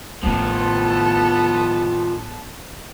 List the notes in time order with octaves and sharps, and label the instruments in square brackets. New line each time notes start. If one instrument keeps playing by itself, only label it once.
[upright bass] A1 A3 [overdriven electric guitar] D#3 F3 [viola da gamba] B3 [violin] A4